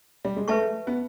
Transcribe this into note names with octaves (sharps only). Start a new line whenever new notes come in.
G3
G#3
A3 B4 E5 A5 C#6
B3